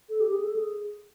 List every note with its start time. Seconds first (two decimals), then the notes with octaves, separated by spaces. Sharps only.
0.09 A4
0.20 G4
0.32 G#4
0.44 A4
0.56 G#4